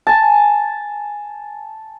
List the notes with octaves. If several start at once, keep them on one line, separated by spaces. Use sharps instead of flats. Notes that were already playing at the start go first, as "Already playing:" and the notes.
G#5 A5